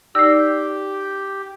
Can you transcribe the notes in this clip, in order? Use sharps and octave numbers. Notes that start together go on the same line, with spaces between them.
D#4 G4 D5 E6 A#6 C7